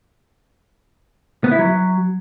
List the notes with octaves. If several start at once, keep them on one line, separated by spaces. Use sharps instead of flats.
B3
E4
F#3